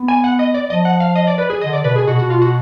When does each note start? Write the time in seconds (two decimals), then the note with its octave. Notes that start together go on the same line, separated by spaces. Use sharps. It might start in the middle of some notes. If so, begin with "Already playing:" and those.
Already playing: B3
0.08 G#5
0.24 F#5
0.39 D#5
0.54 D5
0.70 F3 D#5
0.85 F#5
1.00 F5
1.15 D#5
1.27 D5
1.38 B4
1.50 G#4
1.61 D3 D#5
1.73 D5
1.84 B2 B4
1.96 G#4
2.07 B2 F#4
2.19 F#4
2.30 F4
2.42 F#4